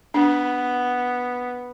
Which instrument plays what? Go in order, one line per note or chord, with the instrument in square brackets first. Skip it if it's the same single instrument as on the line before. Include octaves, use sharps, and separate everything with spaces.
[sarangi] B3 [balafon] D4